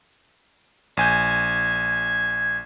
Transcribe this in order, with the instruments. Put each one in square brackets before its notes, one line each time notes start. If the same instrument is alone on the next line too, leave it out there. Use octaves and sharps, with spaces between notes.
[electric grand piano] A#1 G#5 G6 [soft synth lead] G#6